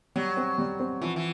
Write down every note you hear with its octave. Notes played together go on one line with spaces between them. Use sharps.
F#3 G3
C4
G3
C4
E3 F3
E3